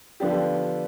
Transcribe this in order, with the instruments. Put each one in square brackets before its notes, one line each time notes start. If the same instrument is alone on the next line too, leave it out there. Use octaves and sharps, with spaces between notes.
[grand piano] D3 F3 B3 D4 G4